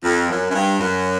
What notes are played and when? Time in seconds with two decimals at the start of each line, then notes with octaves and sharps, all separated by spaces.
0.03 F2
0.29 F#2
0.51 F#2
0.54 G2
0.80 F#2